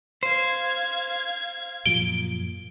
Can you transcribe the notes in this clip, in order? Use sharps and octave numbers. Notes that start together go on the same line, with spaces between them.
C5 F5 G#6
F#2 A#2 F3 D7 G7